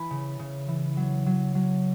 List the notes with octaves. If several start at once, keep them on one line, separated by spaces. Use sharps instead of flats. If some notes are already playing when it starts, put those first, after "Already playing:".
Already playing: E3 G#5 B5
C#3
C#3
E3
F#3
F#3
F#3